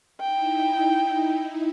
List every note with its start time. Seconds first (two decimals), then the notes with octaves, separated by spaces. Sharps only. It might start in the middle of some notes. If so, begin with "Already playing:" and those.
0.20 D#4 E4 G5